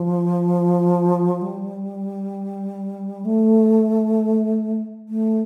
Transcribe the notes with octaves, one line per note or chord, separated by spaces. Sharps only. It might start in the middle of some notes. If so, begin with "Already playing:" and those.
Already playing: F3
G3
A3
A3